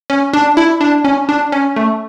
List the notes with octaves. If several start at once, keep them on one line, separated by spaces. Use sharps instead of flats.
C#4
D4
E4
D4
C#4
D4
C#4
A3